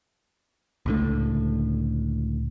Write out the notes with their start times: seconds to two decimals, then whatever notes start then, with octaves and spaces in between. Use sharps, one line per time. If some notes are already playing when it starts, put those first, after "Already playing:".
0.86 C#2 A2 D3